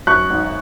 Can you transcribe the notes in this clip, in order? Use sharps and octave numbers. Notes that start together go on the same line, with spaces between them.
F#2 C#6 F#6
G#1